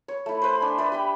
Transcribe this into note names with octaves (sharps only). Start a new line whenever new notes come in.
C#5
A3 E4
B4 C5
D4 G#5
B4 D5 E5
G4 G5 B5